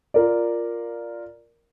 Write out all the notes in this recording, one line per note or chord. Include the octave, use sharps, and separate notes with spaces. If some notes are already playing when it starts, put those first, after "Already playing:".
F4 A#4 D5